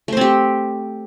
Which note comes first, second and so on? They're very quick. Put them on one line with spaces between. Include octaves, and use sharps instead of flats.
A3 C5 C4 G4